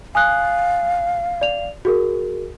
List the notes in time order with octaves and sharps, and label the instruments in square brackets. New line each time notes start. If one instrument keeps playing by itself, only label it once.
[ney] F5 [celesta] G#5 D#6 F#6
[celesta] D5 F7
F#4 G#4 A#4